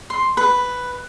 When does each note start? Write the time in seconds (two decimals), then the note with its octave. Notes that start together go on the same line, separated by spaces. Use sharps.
0.10 C6
0.37 B4